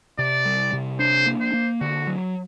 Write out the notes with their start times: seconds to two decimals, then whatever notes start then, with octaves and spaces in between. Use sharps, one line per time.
0.18 C3 D5
0.45 G3
0.73 C3
0.99 D4 C5
1.26 A#3
1.40 C5
1.53 A#3
1.81 D3 F#4
2.07 F#3